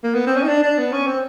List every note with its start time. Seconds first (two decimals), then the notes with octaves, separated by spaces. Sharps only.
0.03 A#3
0.15 B3
0.27 C4
0.37 C#4
0.43 D#4
0.49 D4
0.63 D4
0.78 B3
0.92 C#4
1.07 C4